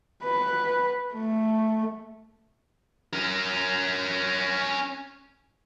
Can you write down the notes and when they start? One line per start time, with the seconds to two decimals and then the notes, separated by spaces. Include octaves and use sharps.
0.24 B4
1.14 A3
3.13 C#4 A#4